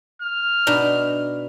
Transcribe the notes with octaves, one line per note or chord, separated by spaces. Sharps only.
F6
B2 D4 D#4